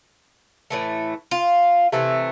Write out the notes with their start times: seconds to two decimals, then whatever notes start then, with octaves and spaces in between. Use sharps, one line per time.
0.70 A2 E3 A3
1.31 F4
1.92 C3 E3 A3